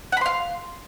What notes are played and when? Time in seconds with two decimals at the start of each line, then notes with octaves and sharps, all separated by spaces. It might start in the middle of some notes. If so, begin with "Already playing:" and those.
0.12 F#5
0.17 B5
0.21 C6
0.26 F5